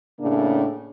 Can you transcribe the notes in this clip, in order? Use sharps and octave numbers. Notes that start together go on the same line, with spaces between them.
A2 C#3 A#3 D4